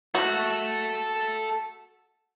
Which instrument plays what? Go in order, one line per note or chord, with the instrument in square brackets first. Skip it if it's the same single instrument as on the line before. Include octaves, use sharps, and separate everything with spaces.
[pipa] F#4 [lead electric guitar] A4 E5